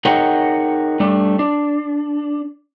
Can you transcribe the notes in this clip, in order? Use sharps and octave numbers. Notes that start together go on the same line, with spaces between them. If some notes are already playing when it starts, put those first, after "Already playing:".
D#4 G#4 A#4 C#5 F#5 G5
G3 A3 D4
D4